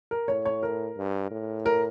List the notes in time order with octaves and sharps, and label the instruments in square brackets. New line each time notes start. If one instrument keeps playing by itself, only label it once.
[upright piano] A#4
[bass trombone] A2 [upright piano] C#5
[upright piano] C#5
A#4
[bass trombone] G2
A2
[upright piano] A#4